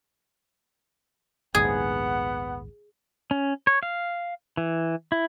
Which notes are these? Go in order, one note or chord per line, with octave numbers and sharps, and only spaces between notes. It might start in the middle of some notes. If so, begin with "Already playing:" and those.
A#1 D#2 G#2 B3 G#4 F#5
C#4
C#5
F5
E3
E4